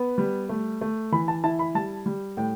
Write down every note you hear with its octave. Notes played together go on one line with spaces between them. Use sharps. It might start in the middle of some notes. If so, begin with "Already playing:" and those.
Already playing: B3
G3
A3
A3
E3 B5
A5
E4 A5
B5
G3 A5
G3
A2 G5